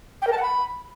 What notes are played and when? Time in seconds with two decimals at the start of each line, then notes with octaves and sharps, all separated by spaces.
0.22 G5
0.27 A#4
0.32 A5
0.37 F#5
0.42 B5